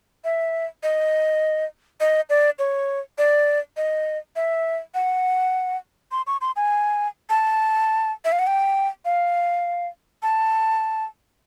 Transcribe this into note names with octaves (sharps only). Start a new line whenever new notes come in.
E5
D#5
D#5
D5
C#5
D5
D#5
E5
F#5
C6
C#6
C6
G#5
A5
E5
F5
F#5
G5
F5
A5